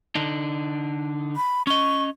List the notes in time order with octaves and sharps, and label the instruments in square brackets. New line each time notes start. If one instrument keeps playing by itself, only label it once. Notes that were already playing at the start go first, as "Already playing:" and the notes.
[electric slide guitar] D3 D4 D#4
[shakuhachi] B5
[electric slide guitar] C#4 D#5 [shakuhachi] C#6